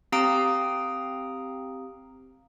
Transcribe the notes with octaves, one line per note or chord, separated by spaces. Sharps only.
C4 G4 F5 A#5 D#6 D7